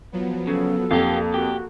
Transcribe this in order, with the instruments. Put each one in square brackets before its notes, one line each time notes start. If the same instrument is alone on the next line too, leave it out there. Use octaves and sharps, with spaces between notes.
[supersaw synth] F3 F#3 B3
[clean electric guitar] C#3 [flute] A4
[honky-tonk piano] F2 [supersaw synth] A#3 [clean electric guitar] F4 G4
[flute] F#4 [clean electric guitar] G4